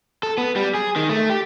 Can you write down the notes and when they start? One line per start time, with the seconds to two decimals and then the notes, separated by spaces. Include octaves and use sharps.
0.23 A4
0.38 B3
0.56 G3
0.75 G#4
0.96 D#3
1.09 A3
1.30 G4